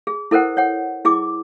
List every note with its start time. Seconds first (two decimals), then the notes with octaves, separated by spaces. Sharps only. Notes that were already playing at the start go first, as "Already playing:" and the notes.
0.07 G#4
0.31 E4 A4 A#4 C5 F#5
0.57 C#5 F#5
1.05 E4 G#4 D6